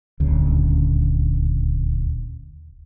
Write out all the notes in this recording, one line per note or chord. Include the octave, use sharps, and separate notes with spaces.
D#1 D2 C#3